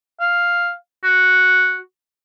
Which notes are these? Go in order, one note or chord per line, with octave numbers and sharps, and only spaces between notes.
F5
F#4